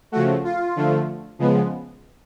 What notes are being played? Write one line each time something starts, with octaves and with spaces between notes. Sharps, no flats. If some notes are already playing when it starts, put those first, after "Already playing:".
C#3 F3 A3 F#4
F4
D3 F3 A3
C#3 F3 G#3 B3